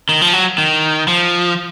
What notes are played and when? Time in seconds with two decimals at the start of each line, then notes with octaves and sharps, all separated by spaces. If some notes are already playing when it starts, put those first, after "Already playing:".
0.09 D#3
0.22 F3
0.33 F#3
0.58 D#3
1.08 F3